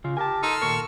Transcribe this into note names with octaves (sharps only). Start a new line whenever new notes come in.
C#3 F4
G4 A#4 G#5 A5
D#4 A4 C6 E6 F6
D#2 A#2 A#4 C#6